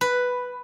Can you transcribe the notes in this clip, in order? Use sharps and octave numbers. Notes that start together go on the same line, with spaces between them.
B4